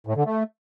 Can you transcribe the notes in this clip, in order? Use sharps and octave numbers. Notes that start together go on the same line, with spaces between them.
A2
D3
A3